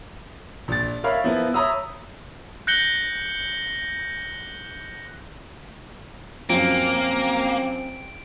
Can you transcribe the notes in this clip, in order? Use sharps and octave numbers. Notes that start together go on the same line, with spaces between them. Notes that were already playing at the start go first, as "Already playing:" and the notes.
A#1 A6
A#4 C#5 E5 F5 B5 F6
F3 B3 E4 A#4
C#5 E5 A#5 B5 D#6 E6
F#6 G6 A#6 C#7 F#7 G7
F#2 F3 A#3 C4 D7